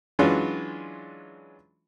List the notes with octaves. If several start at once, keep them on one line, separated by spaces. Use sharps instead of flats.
E3 F#3 G#3 C#4 D4 F4